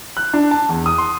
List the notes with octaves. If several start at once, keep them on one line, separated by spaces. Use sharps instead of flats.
F#6
D4
A5
E2
D#6
C6